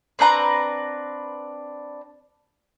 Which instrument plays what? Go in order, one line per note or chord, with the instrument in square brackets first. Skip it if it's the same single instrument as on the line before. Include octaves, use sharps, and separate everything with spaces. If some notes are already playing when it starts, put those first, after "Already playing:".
[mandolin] C4 D4 B4 A#5